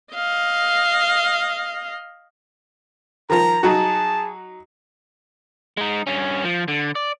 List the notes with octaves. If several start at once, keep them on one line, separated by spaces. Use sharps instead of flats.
D#5 F5
D#3 F3 A#5
F#3 D#4 F#4 G#4 A5
G#3 D#4
G2 C#4
F3
D3
D5